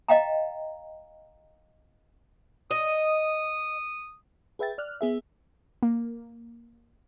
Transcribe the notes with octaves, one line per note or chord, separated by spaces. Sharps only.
D#5 F5 G5 A#5
D#5 D#6
G#4 B4 E5 G5 A6
D5 F6 F#6
B3 G#4 E5
A#3